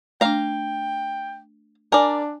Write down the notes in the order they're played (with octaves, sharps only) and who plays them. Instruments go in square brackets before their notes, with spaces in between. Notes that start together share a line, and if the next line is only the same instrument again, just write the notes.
[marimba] A3 D4 [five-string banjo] F5 A#5 [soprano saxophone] G5
[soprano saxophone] D4 [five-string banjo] A#4 D5 [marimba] G#5